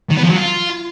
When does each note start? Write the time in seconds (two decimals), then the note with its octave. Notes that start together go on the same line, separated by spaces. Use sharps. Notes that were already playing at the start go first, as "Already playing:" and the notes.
0.10 D#3
0.16 B3
0.23 F3
0.29 F#3
0.36 F4